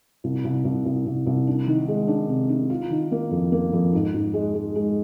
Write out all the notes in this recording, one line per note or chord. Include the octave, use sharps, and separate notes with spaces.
C2
C2
C2
C2
C2
C2
D4
D#3
G#3
D4
C3
D4
F4
D#3
A#3
F2
A#3
F2
G#2
G#2
G#3
G#3
G#3